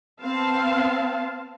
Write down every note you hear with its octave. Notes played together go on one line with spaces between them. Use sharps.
B3 C4 F5 A5